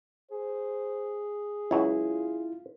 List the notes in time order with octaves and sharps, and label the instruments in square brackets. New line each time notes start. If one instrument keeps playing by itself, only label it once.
[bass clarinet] G#4 [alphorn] C5
[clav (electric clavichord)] C#2 F#3 [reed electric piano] E4 [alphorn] F4